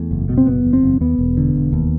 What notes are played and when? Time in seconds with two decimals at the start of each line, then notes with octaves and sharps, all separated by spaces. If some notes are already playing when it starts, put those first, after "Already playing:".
Already playing: E2 A3
0.11 F#1
0.29 B2
0.37 C4
0.47 F#1 B3
0.64 E2
0.73 C4
0.83 F#1
1.01 D#2 B3
1.19 E1
1.37 D3
1.56 E1
1.73 D#2